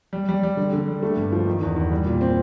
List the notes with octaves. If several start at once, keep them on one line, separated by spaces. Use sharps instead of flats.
G3
G3
G3
D3
D3
G3
A3
G2
F3
D#3
E2
E2
G3
A#2
C4